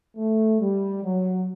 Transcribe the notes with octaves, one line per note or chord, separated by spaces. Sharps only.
A3
G3
F#3